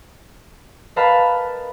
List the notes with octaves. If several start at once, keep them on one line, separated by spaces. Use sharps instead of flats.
A#4 B4 D#5 F5 A5 B5